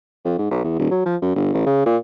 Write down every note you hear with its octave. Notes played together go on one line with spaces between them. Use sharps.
F2
G#2
B1
E2
D#1
F#3
F3
F#2
G1
A1
C#3
A#2